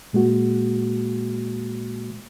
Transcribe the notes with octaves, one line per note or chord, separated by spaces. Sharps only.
A#2 G#3 A#3 F#4